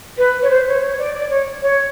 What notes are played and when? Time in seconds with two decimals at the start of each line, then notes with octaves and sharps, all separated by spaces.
0.17 B4
0.42 C#5
0.49 C5
0.66 C#5
0.81 C#5
0.97 D5
1.13 D5
1.29 C#5
1.61 C#5